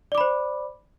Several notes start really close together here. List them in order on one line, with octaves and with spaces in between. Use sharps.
D5 D6 B5 C5